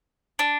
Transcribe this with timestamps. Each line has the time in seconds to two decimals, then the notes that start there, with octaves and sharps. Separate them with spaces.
0.39 D4